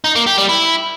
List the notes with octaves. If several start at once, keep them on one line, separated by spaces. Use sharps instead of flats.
D#4
A#3
G4
G3
E4